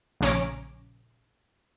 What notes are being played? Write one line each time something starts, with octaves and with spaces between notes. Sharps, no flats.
A#1 C#3 C#4 A#5 D6